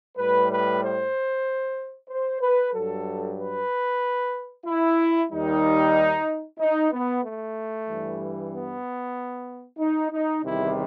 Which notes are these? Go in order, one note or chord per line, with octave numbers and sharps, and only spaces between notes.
A2 G3 B4
B4
C5
C5
B4
G2 F#3 A4
B4
E4
D#2 D#3 G3 D#4
D#4
B3
A3
G2 E3 G3
B3
D#4
D#4
E2 C3 D#3 G3 E4